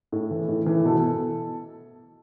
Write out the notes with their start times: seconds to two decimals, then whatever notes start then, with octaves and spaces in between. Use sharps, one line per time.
0.12 A2
0.31 E3
0.48 A2
0.66 E3
0.85 B2 A4